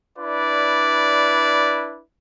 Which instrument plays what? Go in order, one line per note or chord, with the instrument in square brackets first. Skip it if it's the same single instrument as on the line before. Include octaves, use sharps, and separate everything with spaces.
[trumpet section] D4 E4 B4 D5